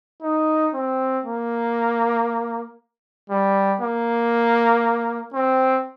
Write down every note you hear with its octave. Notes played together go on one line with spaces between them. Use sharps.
D#4
C4
A#3
G3
A#3
C4